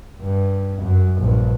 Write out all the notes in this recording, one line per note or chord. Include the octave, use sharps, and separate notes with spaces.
G2
F#2
A#1 G2